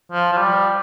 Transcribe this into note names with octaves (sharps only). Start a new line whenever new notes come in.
F3
F3
G3